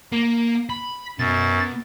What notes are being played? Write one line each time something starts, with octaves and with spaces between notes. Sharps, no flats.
A#3
B5
F#2 B2 A6